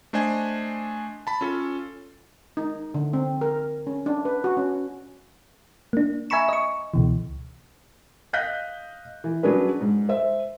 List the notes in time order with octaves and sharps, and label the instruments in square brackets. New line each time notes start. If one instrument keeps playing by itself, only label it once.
[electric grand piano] A3 D4 C5 D#5 G#5
A5 B5
C#4 F4 A4
[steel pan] D#4
D3
C4
A#4
C#4
D4
B4
F#4
C#4
[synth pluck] A#3 D4
E5 G#5 A#5 B5 C#6 E7
D#5 C#6
C#2 B2 E3
[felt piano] D#5 F5 F#6 G6 A#6 B6
E3
F#3 C#4 D4 G#4 B4
G#2
C5 E5